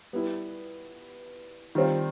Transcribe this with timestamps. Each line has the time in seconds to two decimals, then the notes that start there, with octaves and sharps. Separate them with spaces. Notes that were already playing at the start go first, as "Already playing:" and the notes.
0.13 G3 B3 E4
1.75 D#3 G3 C4 F4